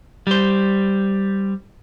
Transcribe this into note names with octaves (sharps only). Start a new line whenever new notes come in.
G3 C5